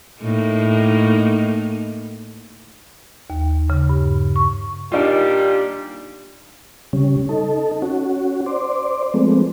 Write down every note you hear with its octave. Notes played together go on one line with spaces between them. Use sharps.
A2 A#3 D#4
D#2
C#3
G2
C#6
A#2 G3 D4 D#4 F4
C#3 G3 C#4
D#4 A4
C#4 F#4
C5 D5
F3 G#3 A3 B3 C4